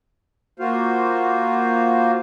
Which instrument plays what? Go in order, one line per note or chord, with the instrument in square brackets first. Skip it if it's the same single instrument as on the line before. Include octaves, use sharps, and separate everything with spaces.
[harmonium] A#3 F4 F#4 C5 F5